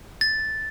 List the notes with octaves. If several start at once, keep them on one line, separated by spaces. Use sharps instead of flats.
A6